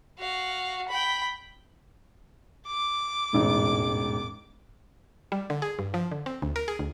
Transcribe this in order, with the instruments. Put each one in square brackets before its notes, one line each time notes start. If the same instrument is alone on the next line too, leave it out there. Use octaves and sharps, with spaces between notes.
[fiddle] F#4 F5
G5 B5
[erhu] D6
[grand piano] E1 A1 G#2
[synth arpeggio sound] G3
D3
G#4
G2
F3
D3
C4
D2
A#4
G#4
D2